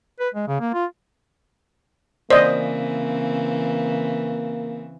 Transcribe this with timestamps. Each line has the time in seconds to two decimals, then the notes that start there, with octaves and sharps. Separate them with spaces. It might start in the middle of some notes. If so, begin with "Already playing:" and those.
0.20 B4
0.34 G#3
0.48 C#3
0.60 A#3
0.74 F4
2.30 C#3 E3 A#3 C4 C5 D5 D#5